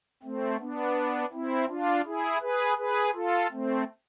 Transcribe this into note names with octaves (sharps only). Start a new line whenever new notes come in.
A3 C4
B3 D4
C4 E4
D4 F4
E4 G#4
G#4 B4
G#4 B4
F4 A4
A3 C4